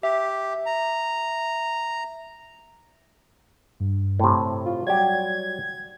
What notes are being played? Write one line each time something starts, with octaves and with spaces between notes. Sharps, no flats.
G4 E5
A#5
G2
A2 C3
F4
F#3 G3 G4 G#6